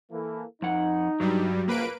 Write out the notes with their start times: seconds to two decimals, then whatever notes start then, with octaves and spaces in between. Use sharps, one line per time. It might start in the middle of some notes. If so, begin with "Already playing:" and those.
0.12 E3 A#3 A4
0.62 F2 D#4 F#5
1.20 G2 F#3 G3
1.67 C#2 F#2 F3 A#3 B4 D7